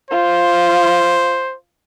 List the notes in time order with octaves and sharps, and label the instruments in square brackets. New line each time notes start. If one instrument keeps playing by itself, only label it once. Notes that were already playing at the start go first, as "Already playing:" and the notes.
[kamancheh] F4 [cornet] C5